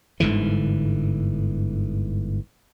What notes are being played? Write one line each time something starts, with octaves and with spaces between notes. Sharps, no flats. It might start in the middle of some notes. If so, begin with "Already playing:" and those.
G1 G#2 D3 E3